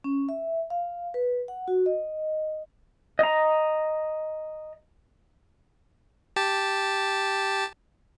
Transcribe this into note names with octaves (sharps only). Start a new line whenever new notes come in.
C#4
E5
F5
B4
F#5
F#4
D#5
D#5 A#5
G4 A5